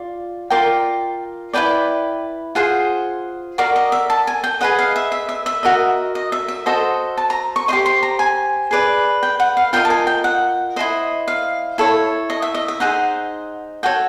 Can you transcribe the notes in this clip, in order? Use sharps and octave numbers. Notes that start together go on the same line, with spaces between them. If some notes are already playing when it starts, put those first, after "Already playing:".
Already playing: F4 D5
F4 A#4 D5 G5
E4 G4 B4 D5 G5
F4 G#4 C5 F#5
F#4 A#4 D5 F5
D#5
E5
A5
G#5
G5
G#4 B4 D#5 F#5
F5
E5
E5
E5
E5
F#4 A#4 D#5
D#5
E5
E5
F#4 A4 C5 D#5
A5
A#5
C#6
G4 C5 D#5 C6
C6
A#5
G#5
G#4 B4 D5
G5
F#5
F5
F4 A#4 D#5 G5
A5
G#5
G5
F#5
E4 A4 C5 D#5
F5
E4 A4 C#5
D#5
E5
D#5
E5
D#4 G#4 C5 F#5
F#4 A4 C#5 G5